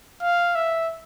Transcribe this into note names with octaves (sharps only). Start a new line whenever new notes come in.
F5
E5